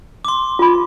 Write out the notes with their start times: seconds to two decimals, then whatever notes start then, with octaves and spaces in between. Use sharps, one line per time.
0.25 C6 D6
0.59 F4 B5